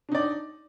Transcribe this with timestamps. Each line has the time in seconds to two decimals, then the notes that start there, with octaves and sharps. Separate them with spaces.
0.09 D4
0.12 D#4
0.15 D5